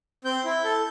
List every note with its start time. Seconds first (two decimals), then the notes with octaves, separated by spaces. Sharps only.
0.25 C4 G6
0.45 E4
0.64 A4